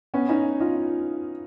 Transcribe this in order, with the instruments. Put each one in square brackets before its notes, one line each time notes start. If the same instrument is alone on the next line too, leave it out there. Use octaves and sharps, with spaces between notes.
[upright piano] B3 C#4
C#4 D#4
D#4 F4